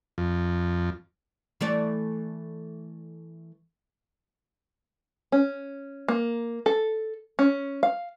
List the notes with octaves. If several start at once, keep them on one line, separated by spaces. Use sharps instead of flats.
F2
E3 A3 D5
C#4
A#3
A4
C#4
F5